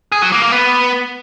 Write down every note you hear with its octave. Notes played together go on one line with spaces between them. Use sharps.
G#4
F#3
A#3
A#3
B3